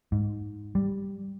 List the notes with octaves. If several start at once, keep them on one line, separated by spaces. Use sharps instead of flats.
G#2
G3